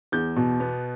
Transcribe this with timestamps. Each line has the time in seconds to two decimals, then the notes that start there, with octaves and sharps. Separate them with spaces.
0.12 E2 G6
0.36 B2
0.60 B3